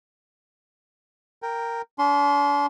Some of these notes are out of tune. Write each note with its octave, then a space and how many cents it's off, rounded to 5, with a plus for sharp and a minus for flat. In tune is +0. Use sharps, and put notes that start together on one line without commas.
A#4 -5 G5 +0
D4 -45 C6 +0